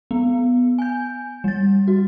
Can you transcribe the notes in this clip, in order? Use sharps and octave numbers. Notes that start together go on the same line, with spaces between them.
B3
G#5 G6
G3 A6
F#4